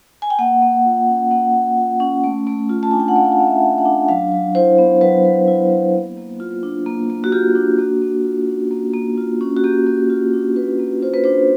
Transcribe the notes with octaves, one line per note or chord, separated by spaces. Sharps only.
G#5
G5
A#3 F#5
A#3
F4
C#4
A#3 F#5
A#3
F4
C#4
A3
A3
F4
A5
D4 G#5
G5
F#5
A3 F5
G5
F#5
A3 F5
E5
F4
F#5
D4
F#3 F5
F#3
E4 C5
B3
F#3 B4
F#3
E4
B3
A#3
A#3
F4
D4
A#3
A#3
F#4
F4 G4
D4
A#3 F#4
A#3
F4
C#4
A#3
A#3
F4
C#4
F#4
A#3 G4
A#3
F4
D4
A#3 B4
A#3
F4 C5
B4
D4 C5